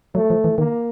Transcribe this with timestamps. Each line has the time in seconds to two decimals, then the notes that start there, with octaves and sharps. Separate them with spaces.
0.15 F#3 A3
0.30 F3
0.44 E3
0.58 D#3 A#3